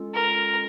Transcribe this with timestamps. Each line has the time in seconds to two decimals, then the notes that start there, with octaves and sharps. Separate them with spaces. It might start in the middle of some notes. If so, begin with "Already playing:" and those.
Already playing: G#3 C#4 F4 A4
0.14 A#4